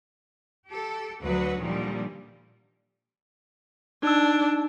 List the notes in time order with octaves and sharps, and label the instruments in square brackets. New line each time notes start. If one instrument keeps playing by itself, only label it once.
[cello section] G4 A4
D2 F#3 F#4 B4
A#2 D3 D#3 F3 G3
[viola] D4 [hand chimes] D#4 E6